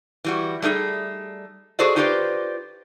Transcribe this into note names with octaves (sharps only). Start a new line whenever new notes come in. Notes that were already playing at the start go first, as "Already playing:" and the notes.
E3 G3 F#4
G3 A3 D#4 G#4
F#4 G#4 A4 C5 D5 D#5
D#4 F4 G4 B4 C5 D5